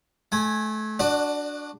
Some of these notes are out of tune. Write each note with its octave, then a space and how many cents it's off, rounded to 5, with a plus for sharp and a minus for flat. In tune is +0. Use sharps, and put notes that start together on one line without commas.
A3 -30 G#5 +0
D4 +0 F#4 +0 D5 +35